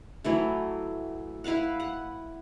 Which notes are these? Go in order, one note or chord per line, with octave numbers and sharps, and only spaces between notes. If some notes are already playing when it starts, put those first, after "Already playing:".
E3 F#3 A3
E4 B4 F5 F#5
F#5